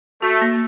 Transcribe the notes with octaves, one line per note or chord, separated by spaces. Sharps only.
A3 F#4
A#3